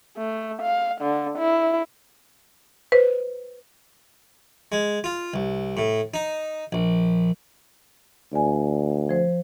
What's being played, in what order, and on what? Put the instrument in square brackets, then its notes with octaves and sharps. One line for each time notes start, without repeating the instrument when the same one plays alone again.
[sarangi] A3
F5
D3
E4
[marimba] B4 C5
[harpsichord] G#3
F4
C2
A2
D#4
A#1
[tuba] D2 [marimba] D5 G#5
[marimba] F3 C5